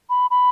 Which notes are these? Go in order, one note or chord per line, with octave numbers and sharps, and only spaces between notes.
B5
B5